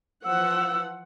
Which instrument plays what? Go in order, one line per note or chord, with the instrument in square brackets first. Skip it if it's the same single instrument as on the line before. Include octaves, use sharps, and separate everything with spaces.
[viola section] E3 F3 F#5 [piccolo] E6